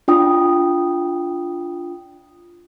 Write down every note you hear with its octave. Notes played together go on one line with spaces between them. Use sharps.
D4 F4 G5 D#6